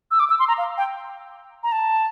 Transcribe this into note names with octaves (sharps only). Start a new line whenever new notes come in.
E6
D6
E6
C6
A#5
F5
G5
A#5
A5